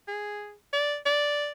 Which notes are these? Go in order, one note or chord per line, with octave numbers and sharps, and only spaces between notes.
G#4
D5
D5